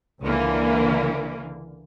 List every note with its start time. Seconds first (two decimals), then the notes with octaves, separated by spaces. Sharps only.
0.21 C#2 D3 E3 A#3